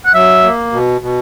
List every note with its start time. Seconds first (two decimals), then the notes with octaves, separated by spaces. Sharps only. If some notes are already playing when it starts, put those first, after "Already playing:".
0.05 F#5
0.14 F#3 E5
0.43 A#3
0.72 B2
1.01 B2